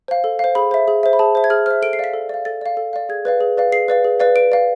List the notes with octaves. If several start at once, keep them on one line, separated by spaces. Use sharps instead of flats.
C5 F5
A4
C5 F5
G#4 B5
C5 E5
G#4
C5 E5
B5
G#4 A5
C5 E5
G#6
G#4 F6
C5 E5 F6
A4 D7
C7
D5 F5 B6
A4
D5 F5
A4 A6
D5 F5
A4
D5 F5
G#4 G#6
B4 D5 F5
G#4
B4 D5 F5
G#4 C7
B4 D5 F5
G#4
B4 D5 F5
B4 D7
D5 F5